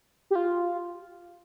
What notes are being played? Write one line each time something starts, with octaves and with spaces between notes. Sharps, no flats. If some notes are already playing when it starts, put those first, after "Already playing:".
G4
F4